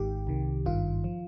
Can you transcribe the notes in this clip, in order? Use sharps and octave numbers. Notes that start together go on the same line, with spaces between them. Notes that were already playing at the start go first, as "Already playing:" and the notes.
Already playing: G#1 G#2 D#3 G4
C2 C3 D#3
G#1 G2 D#3 F4
F3